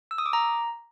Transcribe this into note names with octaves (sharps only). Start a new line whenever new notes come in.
E6
D#6
D6
A#5